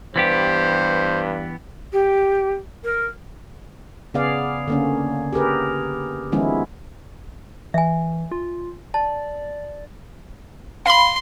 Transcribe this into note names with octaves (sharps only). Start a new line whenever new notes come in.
G2 E3 B3 G4 C5
G4
A#4
C#3 B3 G#4 D5 F5
D3 A#3 C#4
G4 G#4 A#4 B4
D#3 F3 G#3 B3 C#4 E4
E3 E5 G#5
F4
D5 A5
F5 B5 C6